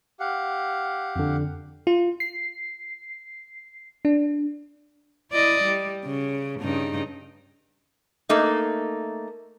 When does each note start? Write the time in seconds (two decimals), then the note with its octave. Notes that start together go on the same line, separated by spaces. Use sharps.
0.20 G4 F5 F#5
1.16 F2 D3
1.87 F4
2.20 C7
4.05 D4
5.31 E4 D5 D#5
5.63 G3
6.05 C#3
6.61 G2 C#3 D#4
8.29 A3 A#3 D#4